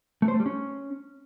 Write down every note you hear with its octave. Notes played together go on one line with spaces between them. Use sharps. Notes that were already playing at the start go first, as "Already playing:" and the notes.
A3
C5
A3
G3
C#4